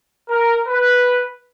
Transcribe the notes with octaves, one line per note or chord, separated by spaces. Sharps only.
A#4
B4